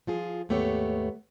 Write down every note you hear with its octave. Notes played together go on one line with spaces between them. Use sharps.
F3 F4 G#4
D#2 G#2 A3 B3 G4 C#5